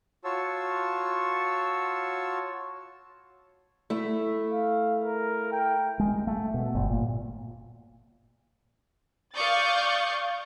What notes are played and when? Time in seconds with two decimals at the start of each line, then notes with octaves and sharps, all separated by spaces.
0.24 F4 F#4 C#5 A5 E6
3.90 A3 E4
4.52 F5
5.04 A#4
5.52 G5
5.99 G#3
6.27 A3
6.54 B2
6.75 G1
6.90 A#2
9.34 D5 F5 C#6 D#6 G6 A6